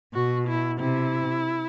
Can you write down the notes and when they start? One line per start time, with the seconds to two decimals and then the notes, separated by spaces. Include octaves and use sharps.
0.14 B2 F#4
0.47 E4
0.80 C3 E4